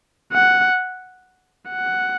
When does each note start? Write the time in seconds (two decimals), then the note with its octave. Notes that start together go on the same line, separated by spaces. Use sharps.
0.33 F#5
1.70 F#5